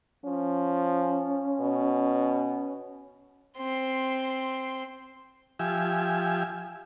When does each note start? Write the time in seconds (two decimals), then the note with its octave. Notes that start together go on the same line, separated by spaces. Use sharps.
0.25 F3 C#4
1.60 B2
3.57 C4 C6
5.59 F3 G4 E5 G#5